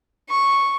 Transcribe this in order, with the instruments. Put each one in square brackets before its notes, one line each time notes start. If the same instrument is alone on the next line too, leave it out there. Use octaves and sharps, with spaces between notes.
[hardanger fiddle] C#6